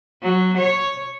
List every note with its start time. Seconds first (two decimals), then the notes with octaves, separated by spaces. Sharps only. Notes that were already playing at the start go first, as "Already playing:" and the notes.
0.22 F#3
0.58 C#5